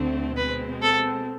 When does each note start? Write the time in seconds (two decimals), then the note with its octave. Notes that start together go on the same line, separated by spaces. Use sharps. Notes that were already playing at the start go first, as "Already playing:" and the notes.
Already playing: D2 D3 A3 C4
0.36 B2 G#3 C4 B4
0.82 A4